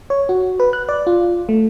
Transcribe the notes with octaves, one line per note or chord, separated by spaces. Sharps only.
C#5
F#4
B4
F#6
D5
F4
A3